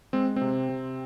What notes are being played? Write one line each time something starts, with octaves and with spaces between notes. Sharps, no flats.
G#3 C4
C4
C3
C3